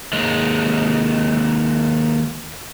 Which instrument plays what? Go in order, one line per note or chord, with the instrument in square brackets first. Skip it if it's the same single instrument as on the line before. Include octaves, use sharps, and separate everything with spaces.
[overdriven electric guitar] D#2 G#3